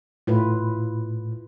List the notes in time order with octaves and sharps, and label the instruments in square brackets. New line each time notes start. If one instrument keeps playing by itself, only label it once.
[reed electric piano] A2 [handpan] E4 F4 B4